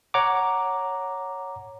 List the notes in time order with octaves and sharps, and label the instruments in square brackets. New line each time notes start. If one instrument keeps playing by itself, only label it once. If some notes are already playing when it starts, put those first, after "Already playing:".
[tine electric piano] C#5 F#5 A#5 D6